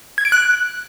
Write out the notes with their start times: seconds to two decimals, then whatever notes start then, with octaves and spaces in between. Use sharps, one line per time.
0.18 G#6
0.25 D7
0.32 F#6